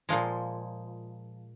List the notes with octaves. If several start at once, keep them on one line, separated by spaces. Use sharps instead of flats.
A#2 F3 G#3